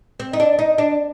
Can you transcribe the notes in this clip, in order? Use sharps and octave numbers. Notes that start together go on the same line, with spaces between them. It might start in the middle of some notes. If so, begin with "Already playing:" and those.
C4
D#4
D4
D#4
D4